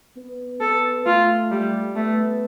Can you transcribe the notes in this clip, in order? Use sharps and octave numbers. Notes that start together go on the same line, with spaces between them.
B3
B3 A4
A3 F4
G3
A3 B3